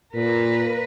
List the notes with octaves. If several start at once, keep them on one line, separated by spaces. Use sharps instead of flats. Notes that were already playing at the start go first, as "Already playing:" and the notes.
A#2 A#4 B4